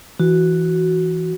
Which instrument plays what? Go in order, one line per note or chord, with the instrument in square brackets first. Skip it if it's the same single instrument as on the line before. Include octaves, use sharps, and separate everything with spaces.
[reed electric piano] E3 [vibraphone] F#4